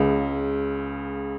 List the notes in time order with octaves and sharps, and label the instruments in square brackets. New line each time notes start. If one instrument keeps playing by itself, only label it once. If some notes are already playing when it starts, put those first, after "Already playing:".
Already playing: [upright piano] C#2 C#3